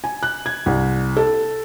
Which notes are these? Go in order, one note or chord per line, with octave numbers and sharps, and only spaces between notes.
G#5
F#6
G#6
C2
A4